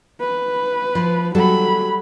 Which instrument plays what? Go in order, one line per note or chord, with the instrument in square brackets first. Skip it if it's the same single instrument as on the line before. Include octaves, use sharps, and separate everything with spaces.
[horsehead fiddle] B4
[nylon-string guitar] F3
[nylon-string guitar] F#3 G3 A4 [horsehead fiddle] F#4 B5